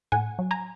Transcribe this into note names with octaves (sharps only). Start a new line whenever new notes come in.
A2 F#5 G#5
F#3
G#5 A#5